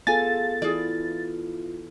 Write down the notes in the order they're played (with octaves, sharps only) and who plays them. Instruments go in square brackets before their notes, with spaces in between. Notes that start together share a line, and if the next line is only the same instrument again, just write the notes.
[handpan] B3 F4 A4 [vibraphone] G#4 F5 [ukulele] G#5 [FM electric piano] A6
[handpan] E3 E4 [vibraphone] F4 [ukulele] G#4 D5